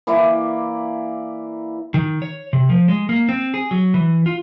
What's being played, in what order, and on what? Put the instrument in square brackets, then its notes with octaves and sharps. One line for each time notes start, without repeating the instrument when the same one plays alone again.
[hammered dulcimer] E3 A#3 E4 D5
[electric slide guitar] D#3
C#5
C3
F3
G#3
A#3
C4
G#4
F#3
E3
F4